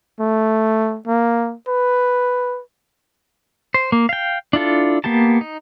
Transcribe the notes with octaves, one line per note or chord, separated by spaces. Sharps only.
A3
A#3
B4
C5
A#3
F5 G5
D4 E4 F4 A4
A#3 B3 G4 A5
D#4